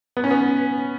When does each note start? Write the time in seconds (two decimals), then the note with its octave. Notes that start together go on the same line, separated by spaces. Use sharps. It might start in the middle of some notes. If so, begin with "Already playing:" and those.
0.17 B3
0.24 C#4
0.31 B3